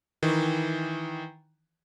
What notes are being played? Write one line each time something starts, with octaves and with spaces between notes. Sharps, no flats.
D#3 E3